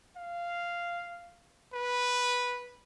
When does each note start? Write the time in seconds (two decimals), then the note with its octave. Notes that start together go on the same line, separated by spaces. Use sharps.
0.17 F5
1.73 B4